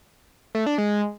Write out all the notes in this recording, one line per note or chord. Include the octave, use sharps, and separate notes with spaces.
A3
D4
G#3